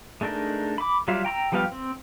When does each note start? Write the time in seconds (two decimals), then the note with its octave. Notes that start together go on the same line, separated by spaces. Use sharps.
0.21 G#3 A3 D4 D#4 A#4
0.78 B5 D6
1.08 F#3 G3 F4 E5 F5
1.25 G5 A#5 C6 E6
1.52 F3 G3 B3 G4 F5
1.71 C4